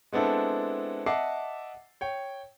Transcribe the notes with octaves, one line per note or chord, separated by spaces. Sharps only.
G#3 B3 C4 D4 E4 A4
D#5 E5 F#5 A5 D6 C7
C#5 G5